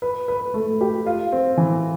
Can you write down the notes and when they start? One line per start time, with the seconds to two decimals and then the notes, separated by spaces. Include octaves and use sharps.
0.02 B4
0.28 B4
0.54 A3
0.81 G4
1.06 F4
1.32 C4
1.57 E3